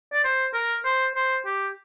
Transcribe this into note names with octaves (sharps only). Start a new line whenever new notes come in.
D5
C5
A#4
C5
C5
G4